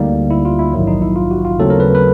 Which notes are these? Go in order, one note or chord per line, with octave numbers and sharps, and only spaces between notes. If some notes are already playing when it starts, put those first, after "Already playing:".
Already playing: D2 D3 G3 A#3 D#4
E4
F4
E4
A#1 G#2 D#3 F#3
D#4
E4
F4
F#4
F4
D#2 C#3 F#3 A3 C4 A4
A#4
B4
B4